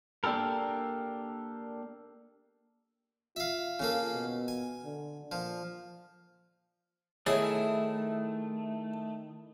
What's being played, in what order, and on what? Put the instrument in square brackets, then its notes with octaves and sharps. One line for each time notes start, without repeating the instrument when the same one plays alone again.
[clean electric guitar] A#3 D4 G4 A4 A#4
[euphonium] F4 [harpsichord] E5 F5
[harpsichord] C#3 A#3 A4
[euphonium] B2
[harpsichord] G#5
[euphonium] D3
[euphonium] A#2 [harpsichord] F3
[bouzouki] D#3 E4 [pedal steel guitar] A3 [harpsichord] G#4 [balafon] C#5